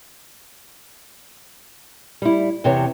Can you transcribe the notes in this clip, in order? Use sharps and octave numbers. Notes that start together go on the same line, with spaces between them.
G3 E4
E2 C3 E3 C#5